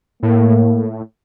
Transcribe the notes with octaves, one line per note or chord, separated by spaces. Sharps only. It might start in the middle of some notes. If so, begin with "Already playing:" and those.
A2 A#3